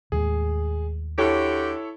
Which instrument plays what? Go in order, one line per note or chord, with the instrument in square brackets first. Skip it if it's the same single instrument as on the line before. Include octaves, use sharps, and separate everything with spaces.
[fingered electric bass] D#2 A2 G#3 [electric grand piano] G#4
[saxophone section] D3 F#4 G4 [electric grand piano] E4 A4 C#5